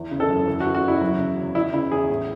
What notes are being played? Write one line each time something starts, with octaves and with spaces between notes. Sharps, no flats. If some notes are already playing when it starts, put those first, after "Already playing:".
Already playing: E2 E3
C#3
A4
F#2
E3
F#4
C#3
F#4
E2 E4
F#3
C#3
E2
E3 E4
C#3 E4
E2 G#4
A2